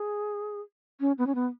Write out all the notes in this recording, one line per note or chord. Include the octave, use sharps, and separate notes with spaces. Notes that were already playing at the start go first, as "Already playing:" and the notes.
Already playing: G#4
C#4
B3
C#4
B3